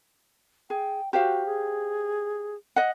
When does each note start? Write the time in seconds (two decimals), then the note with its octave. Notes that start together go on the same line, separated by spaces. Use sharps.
0.70 G#4 G5
1.13 F#4 G4 C5 F5
1.46 G#4
2.76 D#5 F#5